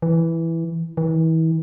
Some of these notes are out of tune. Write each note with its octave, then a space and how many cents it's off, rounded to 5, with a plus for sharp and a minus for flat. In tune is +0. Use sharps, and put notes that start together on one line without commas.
E3 +0
E3 -35